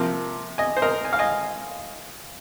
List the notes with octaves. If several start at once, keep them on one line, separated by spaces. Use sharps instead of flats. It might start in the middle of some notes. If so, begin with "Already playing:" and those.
Already playing: C3 F3 A#3
D#5 G#5
C5
A#4 D#5
G#5
F5
D#5 G#5